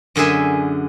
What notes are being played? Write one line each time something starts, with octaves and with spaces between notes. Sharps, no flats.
F#2 D3 G#4 E5 G#5